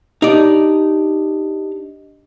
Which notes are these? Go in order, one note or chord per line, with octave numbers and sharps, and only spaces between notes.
D4 D#4 G4 D5 D#5